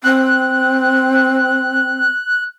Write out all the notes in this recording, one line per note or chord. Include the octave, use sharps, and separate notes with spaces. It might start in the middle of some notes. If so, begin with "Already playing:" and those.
C4 F#6